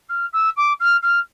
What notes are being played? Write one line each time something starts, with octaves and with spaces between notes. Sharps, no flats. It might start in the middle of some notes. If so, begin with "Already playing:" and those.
F6
E6
D6
F6
F6